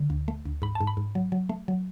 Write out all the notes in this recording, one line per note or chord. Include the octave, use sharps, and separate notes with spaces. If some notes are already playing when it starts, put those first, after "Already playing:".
Already playing: D3
D2
A3
D2
G#2 B5
A5
G#2
B5
G#2
F#3
F#3
A3
F#3